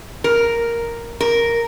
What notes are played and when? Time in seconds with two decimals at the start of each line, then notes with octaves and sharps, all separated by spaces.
0.24 A#4
1.20 A#4